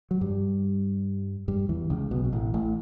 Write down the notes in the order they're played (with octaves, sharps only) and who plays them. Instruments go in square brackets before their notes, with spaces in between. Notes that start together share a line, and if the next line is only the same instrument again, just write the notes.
[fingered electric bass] F#3
G2 G3
G2 G3
E2 E3
C#2 C#3
B1 B2
B2
A1 A2
A1 A2